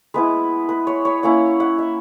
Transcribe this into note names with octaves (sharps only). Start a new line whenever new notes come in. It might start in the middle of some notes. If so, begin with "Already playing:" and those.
G#3 B3 E4 B4
B4
C#5
C#5
A#3 C#4 E4 F#5
F#5
E5